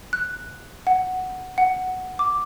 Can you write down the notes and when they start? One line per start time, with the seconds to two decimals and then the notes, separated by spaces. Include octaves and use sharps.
0.13 F#6
0.87 F#5
1.58 F#5
2.19 D6